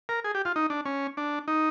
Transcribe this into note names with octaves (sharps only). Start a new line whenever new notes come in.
A#4
G#4
G4
F4
D#4
D4
C#4
D4
D#4